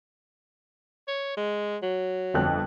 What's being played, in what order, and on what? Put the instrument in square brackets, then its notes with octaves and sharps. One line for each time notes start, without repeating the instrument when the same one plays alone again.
[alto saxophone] C#5
G#3
F#3
[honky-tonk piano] G1 F2 F#6